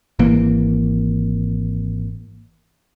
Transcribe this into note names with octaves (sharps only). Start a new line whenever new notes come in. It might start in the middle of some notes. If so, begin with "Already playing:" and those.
G#1 E3 A#3